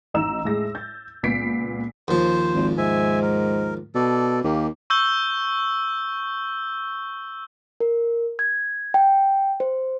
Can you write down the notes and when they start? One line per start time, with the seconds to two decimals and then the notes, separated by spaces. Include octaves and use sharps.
0.14 A1 D#4 A#5 E6 E7
0.45 A2 G#3 A#6
0.75 G6 A6
1.23 C#2 A#2 B3 B6 C7 D7
2.08 D#2 F3 C5
2.55 G#1
2.78 G#2 E5 G#5
3.22 A#4
3.95 B2 A4 D5
4.44 D#2 A#3 G4
4.90 C#6 E6 G6 G7
7.80 A#4
8.39 G#6
8.94 G5
9.60 C5